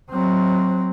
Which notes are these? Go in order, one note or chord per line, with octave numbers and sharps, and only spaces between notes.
F#3 C4